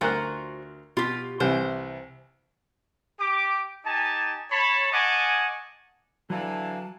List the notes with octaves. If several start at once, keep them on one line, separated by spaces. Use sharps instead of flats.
D2 F4 F#4 A#4 C5 F#6
B2 F4 G4
C2 C3 E3 C5
G4 D6
D#4 G4 G#5 A5
C#5 A5 B5
D#5 F#5 G#5 A5 C#6 D6
D3 E3 F#3 F5 A5